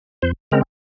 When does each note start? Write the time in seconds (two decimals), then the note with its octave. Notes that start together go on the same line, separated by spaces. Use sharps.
0.22 F2 C5
0.52 C#3 G#3 C4 A#4